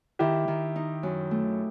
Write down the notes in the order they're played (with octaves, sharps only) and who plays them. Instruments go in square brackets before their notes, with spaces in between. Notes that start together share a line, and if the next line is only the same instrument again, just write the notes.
[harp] D#3 [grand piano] E4 G4
[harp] D#3
D#4
F#2
A3